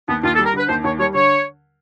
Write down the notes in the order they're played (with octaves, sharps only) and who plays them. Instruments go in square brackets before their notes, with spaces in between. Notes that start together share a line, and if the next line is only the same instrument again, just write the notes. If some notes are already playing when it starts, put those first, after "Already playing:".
[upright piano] D#2 [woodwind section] B3
[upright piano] D#2 [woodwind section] F4
[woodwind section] A4
[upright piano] G3
[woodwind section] A#4
[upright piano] D3 [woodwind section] B4
[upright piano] D#2 [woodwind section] C5
[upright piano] D#2 [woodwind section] C#5
[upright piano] G3 [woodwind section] C#5
[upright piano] D3 [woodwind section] C#5